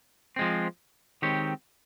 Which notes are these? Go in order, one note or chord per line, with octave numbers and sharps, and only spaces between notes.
F3 G#3 C4
D#3 G#3 C4 G4 C#5